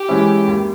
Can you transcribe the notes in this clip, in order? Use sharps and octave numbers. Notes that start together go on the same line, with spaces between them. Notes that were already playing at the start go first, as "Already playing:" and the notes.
Already playing: G4
E3 G#3 C#4 E4
D#2